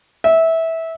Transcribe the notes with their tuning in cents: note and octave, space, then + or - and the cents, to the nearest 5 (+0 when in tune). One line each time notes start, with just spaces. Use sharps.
E5 -15